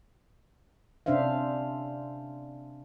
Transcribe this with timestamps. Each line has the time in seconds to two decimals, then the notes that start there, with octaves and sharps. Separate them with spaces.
1.06 C3 C#4 D4 C5 E5 F5